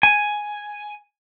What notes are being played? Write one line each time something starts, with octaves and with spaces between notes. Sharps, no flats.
G#5